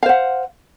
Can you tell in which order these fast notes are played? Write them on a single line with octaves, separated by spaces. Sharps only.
F5 C5 F#5